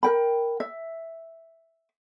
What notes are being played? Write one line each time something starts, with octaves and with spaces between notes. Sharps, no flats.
A#4 G5 B5
E5